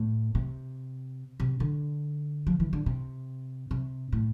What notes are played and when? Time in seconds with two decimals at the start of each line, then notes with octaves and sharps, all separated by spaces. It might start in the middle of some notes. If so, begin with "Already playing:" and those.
Already playing: A2
0.35 C3
1.40 C3
1.60 D3
2.47 F3
2.60 E3
2.73 D3
2.86 C3
3.71 C3
4.12 A2